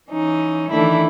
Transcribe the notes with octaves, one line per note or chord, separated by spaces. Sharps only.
E3 C#4 D#4
D#3 E3 A3 D4 E4